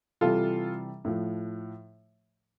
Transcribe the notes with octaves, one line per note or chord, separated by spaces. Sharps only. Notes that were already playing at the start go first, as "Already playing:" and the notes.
C3 E3 G3 F4 A4
A2 F3